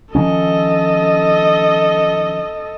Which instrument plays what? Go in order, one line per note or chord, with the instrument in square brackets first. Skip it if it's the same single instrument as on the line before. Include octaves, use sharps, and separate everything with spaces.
[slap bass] D#3 F3 C#4 [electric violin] A4 D#5